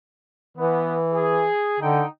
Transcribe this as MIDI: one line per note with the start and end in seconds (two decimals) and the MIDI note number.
0.57 1.48 52
0.57 0.95 59
1.13 1.79 68
1.80 2.03 50
1.80 2.07 63
1.80 2.07 79